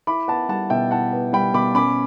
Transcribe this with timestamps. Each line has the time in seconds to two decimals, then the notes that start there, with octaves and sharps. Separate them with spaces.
0.07 E4 B5 D6
0.28 B3 F#5 A5
0.49 G3 F#5 A5
0.70 B2 E5 G5
0.91 E4 F#5 A5
1.13 B3
1.33 G3 G5 B5
1.54 B2 B5 D6
1.75 C#4 B5 D6